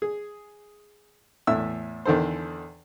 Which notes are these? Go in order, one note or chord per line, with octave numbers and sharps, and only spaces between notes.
G#4
E2 A2 E5 E6
E2 D3 D#3 A4 C5